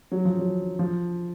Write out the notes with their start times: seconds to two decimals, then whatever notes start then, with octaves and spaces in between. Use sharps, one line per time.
0.12 F#3
0.25 F3
0.39 F#3
0.79 F3